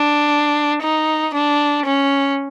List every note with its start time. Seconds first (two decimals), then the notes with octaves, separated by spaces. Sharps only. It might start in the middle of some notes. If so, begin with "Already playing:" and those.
Already playing: D4
0.82 D#4
1.34 D4
1.86 C#4